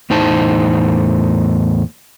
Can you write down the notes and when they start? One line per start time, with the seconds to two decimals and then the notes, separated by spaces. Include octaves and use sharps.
0.10 E2 A2 D#4 C5 A5